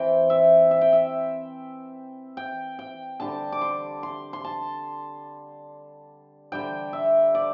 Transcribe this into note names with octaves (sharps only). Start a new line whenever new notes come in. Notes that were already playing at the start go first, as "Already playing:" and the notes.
Already playing: E3 C4 G5
E5
E5
G5
E5
G5
G5
D3 G3 D4 A5
D6
C6
C6
C6
A5
D3 G3 D4 G5
E5
D5